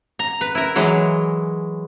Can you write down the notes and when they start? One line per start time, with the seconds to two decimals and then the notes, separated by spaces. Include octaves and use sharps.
0.19 A#5
0.41 B4
0.55 E4 A#4
0.76 E3 F#3 G#3